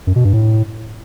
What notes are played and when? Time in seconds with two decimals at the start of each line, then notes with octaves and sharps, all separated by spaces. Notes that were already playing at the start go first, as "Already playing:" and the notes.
0.07 F#2
0.16 B2
0.24 G2
0.33 A2